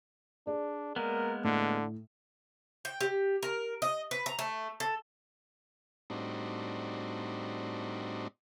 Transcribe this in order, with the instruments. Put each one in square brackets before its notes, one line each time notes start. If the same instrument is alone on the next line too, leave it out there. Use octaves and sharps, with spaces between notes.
[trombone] D4 [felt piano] G#4 D5
[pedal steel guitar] G#3 A#3 B3 [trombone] A#4
[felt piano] A2 [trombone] D3
[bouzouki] G5
G4
A#4
D#5
B4
A#5
A3
A4
[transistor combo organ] A2 G3 C4 D4 D#4 F#4